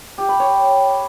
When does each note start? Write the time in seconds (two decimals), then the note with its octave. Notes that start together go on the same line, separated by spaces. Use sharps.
0.18 G4
0.29 B5
0.40 C#5